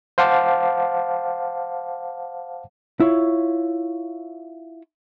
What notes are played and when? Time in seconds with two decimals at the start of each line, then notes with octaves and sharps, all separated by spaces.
0.18 C5 F5 F#5 A5 D6
3.00 E4 F4 C#5